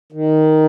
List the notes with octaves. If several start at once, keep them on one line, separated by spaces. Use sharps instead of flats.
D#3